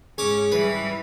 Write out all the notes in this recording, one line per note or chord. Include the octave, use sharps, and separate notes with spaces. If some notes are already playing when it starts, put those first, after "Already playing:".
G#2 C#4 G#4 C#5 D6
E3 G3 B4